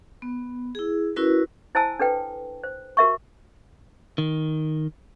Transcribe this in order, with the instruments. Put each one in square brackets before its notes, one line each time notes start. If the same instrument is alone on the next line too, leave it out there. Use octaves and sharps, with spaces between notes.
[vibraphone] B3
E4 G#4
C#4 E4 F#4 A#4 B4
[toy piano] E4 C5 G#5 A5 E6
D4 A4 B4 G5
C5
F#4 A#4 E5 C#6
[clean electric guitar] D#3